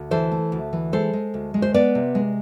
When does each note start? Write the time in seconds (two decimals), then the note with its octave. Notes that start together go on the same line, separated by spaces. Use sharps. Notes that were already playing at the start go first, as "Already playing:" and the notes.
Already playing: D2
0.11 E3 A4 C5
0.32 A3
0.52 D2
0.73 E3
0.93 G#3 A4 C5
1.13 G#3
1.34 D2
1.54 G#3
1.62 C5
1.74 B3 B4 D5
1.95 C3
2.15 G#3